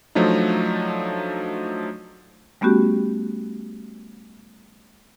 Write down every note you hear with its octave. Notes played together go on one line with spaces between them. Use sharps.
F3 F#3 A3 D4 D#4
G3 A3 B3 C#4 F#4 G4